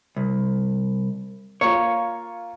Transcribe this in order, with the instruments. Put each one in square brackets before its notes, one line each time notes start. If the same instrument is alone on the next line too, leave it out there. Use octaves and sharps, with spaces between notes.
[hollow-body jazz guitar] C2
[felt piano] A#3 F4 [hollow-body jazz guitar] C#5